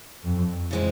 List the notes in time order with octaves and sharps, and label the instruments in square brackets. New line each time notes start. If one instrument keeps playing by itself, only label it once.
[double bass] F2
[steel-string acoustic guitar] C#3 E3 G#3 C4